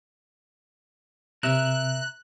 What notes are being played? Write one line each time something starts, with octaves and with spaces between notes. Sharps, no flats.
C3 A#4 E5 F#6